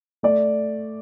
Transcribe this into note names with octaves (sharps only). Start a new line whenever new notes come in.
A3 D5